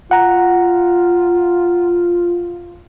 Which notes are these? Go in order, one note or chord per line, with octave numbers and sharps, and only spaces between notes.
F4 F#5 A#5